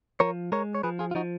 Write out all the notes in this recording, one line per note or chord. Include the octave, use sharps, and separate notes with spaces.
F3 A#4 C#5
G#3 A#4 C#5
C#5
F3 G#4 B4
F4 G#4
F4
F3 D#4 F#4